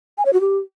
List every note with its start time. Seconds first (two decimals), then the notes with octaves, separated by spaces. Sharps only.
0.18 G#5
0.26 C#5
0.33 F#4
0.41 G4